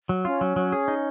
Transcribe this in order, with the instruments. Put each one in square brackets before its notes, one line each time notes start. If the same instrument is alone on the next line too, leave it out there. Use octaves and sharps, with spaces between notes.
[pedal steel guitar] F#3
[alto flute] C#4 [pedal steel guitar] F4
[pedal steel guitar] F#3
F#3
G#4
D#4